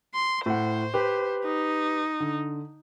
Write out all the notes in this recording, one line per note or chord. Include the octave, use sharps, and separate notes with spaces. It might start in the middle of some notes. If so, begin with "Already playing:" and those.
C6
A2 C5 F#5
G4 B4
D#4
D3